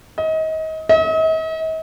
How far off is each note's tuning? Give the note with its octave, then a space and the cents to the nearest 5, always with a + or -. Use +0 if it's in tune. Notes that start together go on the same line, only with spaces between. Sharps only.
D#5 +30
D#5 +45